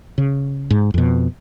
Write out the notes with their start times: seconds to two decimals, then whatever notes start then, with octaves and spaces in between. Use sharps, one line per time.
0.18 C#3
0.71 G#2
0.94 F2 B2